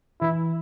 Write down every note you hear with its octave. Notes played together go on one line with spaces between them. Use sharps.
E3 E4